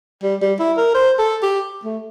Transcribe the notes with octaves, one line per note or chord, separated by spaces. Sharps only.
G3
G3
E4
A#4
C5
A4
G4
A3